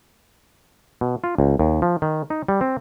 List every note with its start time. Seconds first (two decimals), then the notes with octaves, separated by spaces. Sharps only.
1.01 B2
1.24 F4
1.38 C#2
1.59 D#2
1.82 F3
2.02 D#3
2.30 D#4
2.48 G3
2.61 C4